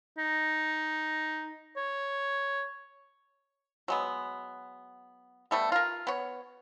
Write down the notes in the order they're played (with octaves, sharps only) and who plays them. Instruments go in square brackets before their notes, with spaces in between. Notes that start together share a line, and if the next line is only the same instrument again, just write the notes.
[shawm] D#4
C#5
[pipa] F#3 G#3 B3
G3 A3 B3
F4 A#4
B3 C#5